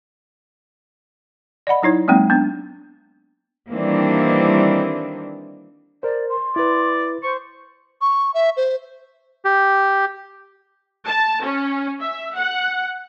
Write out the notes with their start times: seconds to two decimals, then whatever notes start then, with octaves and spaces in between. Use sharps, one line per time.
1.67 D5 D#5 F#5 B5
1.82 F#3 D#4 E4 C#5
2.08 F#3 G#3 A#3 C4 D#4
2.30 B3 D4
3.70 D#3 E3 G3 A#3 C4 D4
6.03 A#4 C5 D5
6.30 C6
6.56 E4 B4 D5
7.23 C5 C#6
8.01 C#6
8.34 E5
8.57 C5
9.45 G4
11.07 A5
11.43 C#4
12.00 E5
12.35 F#5